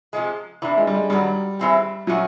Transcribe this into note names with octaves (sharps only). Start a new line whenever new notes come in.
C3 F3 G#3
E2 C3 E3 D4
G#3
G3
G#3
G2 D#3 F#3 G3
E3 G#3 C4 E4 G4
A#2 F3 F#3 A3 C#4 F#4